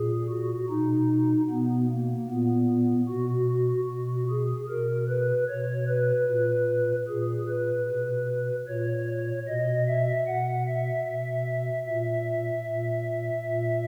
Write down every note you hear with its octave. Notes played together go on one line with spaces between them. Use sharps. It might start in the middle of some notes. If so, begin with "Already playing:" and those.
Already playing: A#2 G#4
F#4
B2 D#4
B2 B3
A#3
A#2 B3
B2 F#4
B2 F#4
G#4
B2 A#4
B4
B2 C#5
B4
A#2
A#2 G#4
B4
B2
A#2 C#5
B2 D#5
E5
B2 F#5
E5
B2 E5
A#2 E5
A#2
A#2